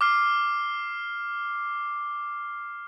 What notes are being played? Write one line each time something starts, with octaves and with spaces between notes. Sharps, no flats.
D6 F6 C7